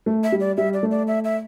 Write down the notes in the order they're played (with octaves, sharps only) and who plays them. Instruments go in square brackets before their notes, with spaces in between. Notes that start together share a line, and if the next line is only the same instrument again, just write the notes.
[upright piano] A3
[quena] E5
[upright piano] G3
[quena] D5
[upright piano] G3 [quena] E5
[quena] D5
[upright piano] A3
[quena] D5
E5
E5